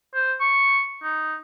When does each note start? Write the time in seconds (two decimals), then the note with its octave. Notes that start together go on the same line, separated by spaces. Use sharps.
0.15 C5
0.40 C#6
1.03 D#4